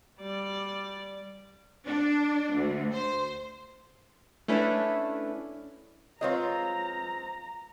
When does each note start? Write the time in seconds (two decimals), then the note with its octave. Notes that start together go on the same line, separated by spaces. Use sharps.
0.21 G3 D5
1.86 D4
2.54 D2
2.94 C5
4.48 A3 C#4 D4 E4 B4
6.21 G#3 C4 F4 B4 C#5 D#5 A#5